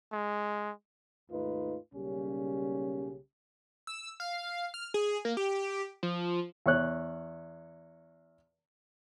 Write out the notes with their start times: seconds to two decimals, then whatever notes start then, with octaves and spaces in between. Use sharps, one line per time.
0.13 G#3
1.30 D#2 G#2 A3 D#4 F4 B4
1.93 B1 C#3 G3 A#3 C#4 G4
3.87 E6
4.20 F5
4.74 F6
4.94 G#4
5.25 A#3
5.37 G4
6.03 F3
6.66 E2 C#5 F#6